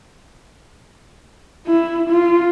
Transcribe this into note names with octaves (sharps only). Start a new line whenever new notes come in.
E4
F4